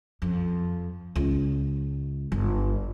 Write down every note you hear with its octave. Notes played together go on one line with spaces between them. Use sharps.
F2
C#2
G1